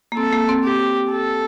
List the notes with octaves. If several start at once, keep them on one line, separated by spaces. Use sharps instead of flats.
A#3
C4 A4
A#3
C4
G4
A4